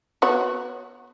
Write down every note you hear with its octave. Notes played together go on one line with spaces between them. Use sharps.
B3 F#4 C#5